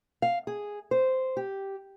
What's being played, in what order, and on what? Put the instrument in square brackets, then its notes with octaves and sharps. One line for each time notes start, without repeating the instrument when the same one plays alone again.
[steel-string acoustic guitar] F5
G#4
C5
G4